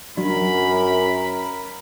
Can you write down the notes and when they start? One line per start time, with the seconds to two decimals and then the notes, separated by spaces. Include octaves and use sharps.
0.17 F#2 F#3 D4 A#4 B5